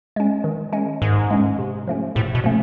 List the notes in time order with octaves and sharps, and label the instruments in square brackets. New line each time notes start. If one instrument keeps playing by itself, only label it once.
[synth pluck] G#3 C#4
D#3
G#3 C#4
[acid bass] G#2 [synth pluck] D#3
[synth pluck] G#3 C#4
C3
F3 A3 C#4
[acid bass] A2 [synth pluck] C3
[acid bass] B2
[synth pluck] F3 A3 C#4